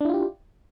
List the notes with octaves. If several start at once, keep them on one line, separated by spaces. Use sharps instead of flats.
D4 E4 F4 G4